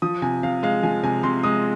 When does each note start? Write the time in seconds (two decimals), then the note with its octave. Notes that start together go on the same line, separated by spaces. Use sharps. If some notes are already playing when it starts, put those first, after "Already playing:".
0.02 F3 D#6
0.22 C3 G#5
0.43 C3 F5
0.63 G#3 F5
0.83 F3 G#5
1.03 C3 G#5
1.23 C3 C6
1.43 G#3 D#6